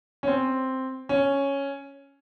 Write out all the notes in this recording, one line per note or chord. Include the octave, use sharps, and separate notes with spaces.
C#4
C4
C#4